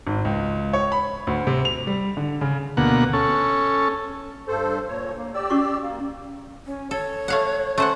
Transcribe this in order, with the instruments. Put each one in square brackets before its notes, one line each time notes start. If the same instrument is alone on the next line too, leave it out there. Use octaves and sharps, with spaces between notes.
[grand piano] G#1
C#2
C#5
B5
D2
C3
F7
G3
D3
C#3
[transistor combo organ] D2 B2 A#3 F#5
C#4 A4
[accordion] G2 A4 C5
A#2 C#5
A#3
G4 D5 E6
[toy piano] C#4 F#4 C#6
[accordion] A#3
[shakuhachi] C#4
[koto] A4 [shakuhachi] C#5
[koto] A3 F5 F#5
[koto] A3 C5 F#5 [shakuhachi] C#4